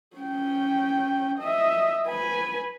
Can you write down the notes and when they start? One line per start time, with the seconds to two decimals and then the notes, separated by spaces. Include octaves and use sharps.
0.17 C#4 G5
1.39 D#5 E5
2.07 B4 G#5